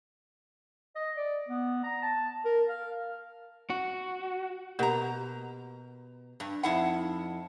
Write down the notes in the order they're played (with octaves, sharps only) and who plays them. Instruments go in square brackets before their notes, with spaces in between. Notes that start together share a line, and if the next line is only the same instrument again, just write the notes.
[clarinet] D#5
D5
B3
A#5
A5
A#4
F5
[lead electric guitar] F#4
[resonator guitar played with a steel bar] B2 A#5 [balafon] A#3 G4 A#4
[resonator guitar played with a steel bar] G2
[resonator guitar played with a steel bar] F2 E4 F#5 [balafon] D#4 B5